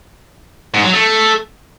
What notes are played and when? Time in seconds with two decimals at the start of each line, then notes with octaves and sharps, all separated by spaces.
0.74 G#2
0.84 F#3
0.94 A3